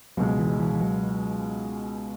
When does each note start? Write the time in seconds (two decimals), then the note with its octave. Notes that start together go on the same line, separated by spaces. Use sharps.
0.17 C#2 B2 F#3 G#3
0.39 E3
0.60 E3
0.74 E3
0.81 F#3